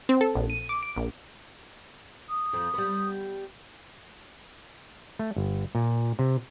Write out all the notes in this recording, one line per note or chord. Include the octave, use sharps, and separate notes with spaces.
C4
A4
A#1
D#7
D6
D7
A#1
D#6
F2 F3
G3 B3
A3
G1
A#2
C3